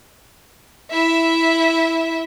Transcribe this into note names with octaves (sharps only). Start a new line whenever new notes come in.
E4 E5